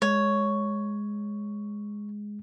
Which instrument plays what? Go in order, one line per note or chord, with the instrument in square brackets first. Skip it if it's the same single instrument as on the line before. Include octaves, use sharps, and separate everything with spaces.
[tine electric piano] G#3 [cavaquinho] C#5